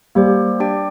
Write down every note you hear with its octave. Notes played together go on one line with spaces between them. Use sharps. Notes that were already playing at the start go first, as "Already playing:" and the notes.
G3 A#3 G4 C5
D4 G4 D5 G5